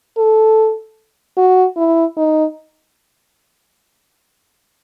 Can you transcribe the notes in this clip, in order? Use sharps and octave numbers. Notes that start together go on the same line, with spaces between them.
A4
F#4
E4
D#4